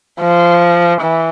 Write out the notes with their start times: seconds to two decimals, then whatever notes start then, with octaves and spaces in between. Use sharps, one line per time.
0.20 F3
1.01 E3